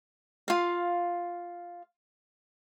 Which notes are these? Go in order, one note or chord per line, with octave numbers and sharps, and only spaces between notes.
F4 F5